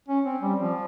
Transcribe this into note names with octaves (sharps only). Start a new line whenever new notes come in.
C#4
C4
G3
F3